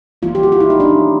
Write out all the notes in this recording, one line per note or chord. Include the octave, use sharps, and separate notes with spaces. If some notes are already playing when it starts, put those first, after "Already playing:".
E3 G3 A#3 F4
G4
F#4
F4
E4
D#4
D4
C#4
E3 A3